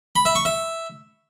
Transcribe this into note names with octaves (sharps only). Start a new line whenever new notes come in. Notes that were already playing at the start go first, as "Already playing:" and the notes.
B5
E5
C#6
E5